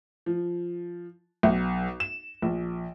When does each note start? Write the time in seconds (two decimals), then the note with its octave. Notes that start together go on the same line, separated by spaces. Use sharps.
0.26 F3
1.43 B1
2.00 E7
2.42 A#1